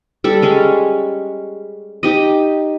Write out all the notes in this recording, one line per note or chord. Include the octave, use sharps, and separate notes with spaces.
G3 A4 D5
G3 G#3 C#4
D#4 G4 D#5